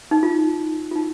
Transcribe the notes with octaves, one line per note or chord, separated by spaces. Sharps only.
D#4
F4
F4
D#4